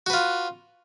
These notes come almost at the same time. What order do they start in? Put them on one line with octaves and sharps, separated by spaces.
F#4 B4 F4